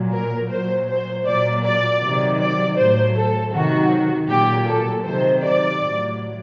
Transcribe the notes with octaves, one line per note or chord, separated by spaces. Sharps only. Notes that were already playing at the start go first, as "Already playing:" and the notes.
Already playing: A#2 F#3
A#4
A#2 F#3 C5
C5
A#2 F#3 D5
D5
C3 D#3 F#3
D5
A2 F#3 C5
A4
C3 D#3 F#3 F#4
A#2 F#3 G4
A4
C3 D#3 F#3 C5
D5
A2 F#3